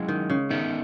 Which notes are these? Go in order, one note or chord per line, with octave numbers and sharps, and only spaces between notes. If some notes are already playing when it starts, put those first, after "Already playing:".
Already playing: F#3 G#3 C#4 E4
D#3
C#3
D#3 B3 D#4 A4 E5